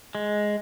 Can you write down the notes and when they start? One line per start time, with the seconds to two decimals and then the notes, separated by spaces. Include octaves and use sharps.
0.15 G#3